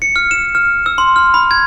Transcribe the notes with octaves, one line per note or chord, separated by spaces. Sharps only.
C#7
F6
E7
F6
E6
C6
F6
B5
G#6